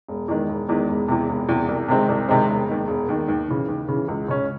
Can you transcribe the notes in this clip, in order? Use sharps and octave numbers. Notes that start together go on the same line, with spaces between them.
E1
E2 D#3 G#3
E1
E2 D#3 G#3
E1
E2 C3
E1
E2 C3
C2
C3 D#3 G#3 C4
C2
C3 D#3 G#3 C4
E1
D#2 D#3
E1
D#2 D#3
D#2
C#3 E3
D#2
C#3 E3
C#2
C#3 G#3 C#4